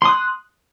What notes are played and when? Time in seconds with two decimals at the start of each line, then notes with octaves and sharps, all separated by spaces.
0.02 C6
0.05 D#6
0.09 F#6